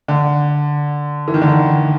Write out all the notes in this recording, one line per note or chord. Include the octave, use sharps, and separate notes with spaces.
D3
E3
D#3
D3
D#3